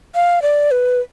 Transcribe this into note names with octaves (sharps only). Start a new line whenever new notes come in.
F5
D5
B4